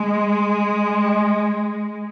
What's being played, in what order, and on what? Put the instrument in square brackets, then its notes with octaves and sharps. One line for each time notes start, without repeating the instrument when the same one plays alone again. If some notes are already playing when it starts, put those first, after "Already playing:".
Already playing: [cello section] G#3